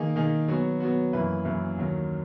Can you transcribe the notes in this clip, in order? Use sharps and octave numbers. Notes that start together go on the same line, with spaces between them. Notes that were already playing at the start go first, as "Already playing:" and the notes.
Already playing: D#3 A#3 D#4 G#4
D#3 A#3 D#4 G#4
F#3 B3 F#4
F#3 B3 F#4
F#2 E3 A#3 E4 B4
F#2 E3 A#3 E4 B4
D#2 D#3 F#3